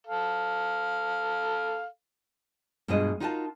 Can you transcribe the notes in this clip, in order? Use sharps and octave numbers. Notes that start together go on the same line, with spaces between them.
A4 F5
G2 B2 G#3 F4 B4 D#5
D#4 F4 F#4 A#4 F5 A5